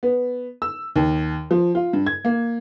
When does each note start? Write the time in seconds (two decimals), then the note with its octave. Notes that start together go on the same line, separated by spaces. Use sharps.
0.03 B3
0.62 E6
0.96 D#2
1.51 F3
1.75 F4
1.93 G2
2.06 G#6
2.25 A#3